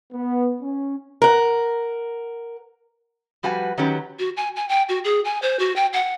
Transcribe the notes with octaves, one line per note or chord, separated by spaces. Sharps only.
B3
C#4
A#4 F#5
F3 G3 F#4 B4 G#5
D#3 F#3 C#4 G4 B4
F#4
G#5
G#5
G5
F#4
G#4
G#5
C5
F#4
G5
F#5